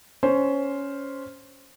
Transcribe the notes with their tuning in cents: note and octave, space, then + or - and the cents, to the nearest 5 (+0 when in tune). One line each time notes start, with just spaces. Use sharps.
C#4 +10 C5 +0